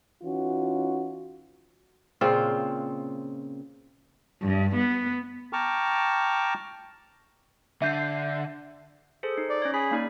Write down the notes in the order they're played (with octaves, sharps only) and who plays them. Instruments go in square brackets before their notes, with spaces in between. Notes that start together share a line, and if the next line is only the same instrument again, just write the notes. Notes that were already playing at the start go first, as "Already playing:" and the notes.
[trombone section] E3 C#4 D#4 F4 F#4
[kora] A#2 C#3 C4 F4
[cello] G2
B3
[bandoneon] G5 A5 A#5 C#6 D6 F6
[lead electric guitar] D3 [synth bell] E5 G6 C7
[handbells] G#4 A4 C5
D#4
[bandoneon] D5
[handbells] C#4 C#5
[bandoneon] G#4 [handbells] B5 B6
[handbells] A#3 D#4 D5